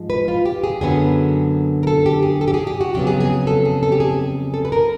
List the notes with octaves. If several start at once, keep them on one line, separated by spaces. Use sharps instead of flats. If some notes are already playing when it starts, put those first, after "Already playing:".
Already playing: G#2 F3 G#3
B4
F4
G4
G#4
F#2 D3 F#3 B3 G#4
A#4
A4
G4
G#4
A4
G4
G#4
G4
F#4
F2 C#3 F#3 B3 G4
G#4
G#4
A4
G#4
A4
G4
G#4
A4
B4
A#4